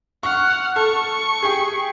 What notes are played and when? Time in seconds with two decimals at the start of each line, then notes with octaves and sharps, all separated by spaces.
0.23 F#5 C#6 F6
0.76 A4 C#6
1.43 G4 G#4